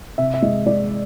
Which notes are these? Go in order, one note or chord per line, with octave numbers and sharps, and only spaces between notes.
C3 E5
E5
G#3 D#5
G#3 D5